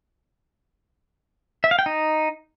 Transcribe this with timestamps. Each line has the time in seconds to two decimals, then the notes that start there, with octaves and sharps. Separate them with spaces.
1.64 E5
1.71 F5
1.79 G5
1.86 D#4